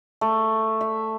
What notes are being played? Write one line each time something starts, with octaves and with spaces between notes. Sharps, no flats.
A3
E5